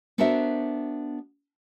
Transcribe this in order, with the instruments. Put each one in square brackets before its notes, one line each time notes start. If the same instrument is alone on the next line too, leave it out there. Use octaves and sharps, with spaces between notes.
[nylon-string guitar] B3 D4 F#4 A#4 C5 E5